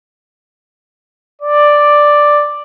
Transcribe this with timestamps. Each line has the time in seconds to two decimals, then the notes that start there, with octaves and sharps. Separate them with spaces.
1.42 D5